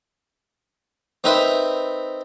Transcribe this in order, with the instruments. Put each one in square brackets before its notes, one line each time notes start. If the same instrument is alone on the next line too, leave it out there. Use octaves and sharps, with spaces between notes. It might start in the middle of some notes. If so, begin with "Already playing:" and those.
[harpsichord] C4 D#4 A#4 B4 E5